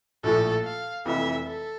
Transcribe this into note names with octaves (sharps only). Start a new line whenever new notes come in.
A#1 A2 F3 A4
F5
F1 F2 E3 E5
A4